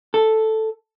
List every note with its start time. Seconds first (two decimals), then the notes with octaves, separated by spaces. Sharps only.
0.14 A4